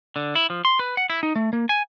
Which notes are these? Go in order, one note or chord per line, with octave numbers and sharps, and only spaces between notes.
D3
E4
F3
C6
B4
F#5
E4
D#4
A3
A#3
G#5